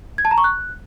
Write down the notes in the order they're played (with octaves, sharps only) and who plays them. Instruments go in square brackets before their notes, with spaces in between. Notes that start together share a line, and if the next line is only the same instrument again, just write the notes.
[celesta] G#6
A5
A#5
C#6
F#6